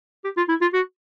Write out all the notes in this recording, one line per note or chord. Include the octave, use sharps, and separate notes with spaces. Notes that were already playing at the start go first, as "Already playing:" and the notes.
G4
F4
E4
F4
F#4